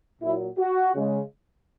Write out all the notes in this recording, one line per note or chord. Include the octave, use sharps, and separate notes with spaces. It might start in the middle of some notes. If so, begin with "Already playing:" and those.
A#2 F#3 E4
F#4
C#3 G#3